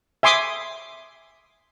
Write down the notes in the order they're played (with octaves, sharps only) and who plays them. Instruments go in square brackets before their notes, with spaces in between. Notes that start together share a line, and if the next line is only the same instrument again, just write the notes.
[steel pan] E5 G#5 C6 D6 D#6